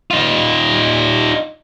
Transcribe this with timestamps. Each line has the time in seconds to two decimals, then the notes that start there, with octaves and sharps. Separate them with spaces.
0.11 D#4 F4